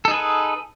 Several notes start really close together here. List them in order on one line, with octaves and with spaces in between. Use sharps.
A4 D#4 G#4 B4